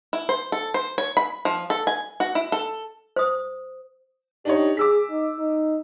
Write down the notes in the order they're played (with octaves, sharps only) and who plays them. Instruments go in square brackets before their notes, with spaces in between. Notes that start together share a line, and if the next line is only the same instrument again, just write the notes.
[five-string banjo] E4
C5
A4
C5
C#5
B5
F3
A4
G#5
F#4
E4
A4
[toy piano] C5 D#6
[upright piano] D4 D#4 C#5 [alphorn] G4
[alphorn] G#4 [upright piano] D6 E6 B6
[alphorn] D#4
D#4